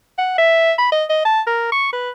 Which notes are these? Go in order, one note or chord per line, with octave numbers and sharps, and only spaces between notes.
F#5
E5
B5
D#5
D#5
A5
A#4
C#6
B4